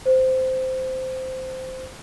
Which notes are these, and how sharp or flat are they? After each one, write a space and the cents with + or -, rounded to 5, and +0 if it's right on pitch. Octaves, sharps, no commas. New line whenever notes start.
C5 -10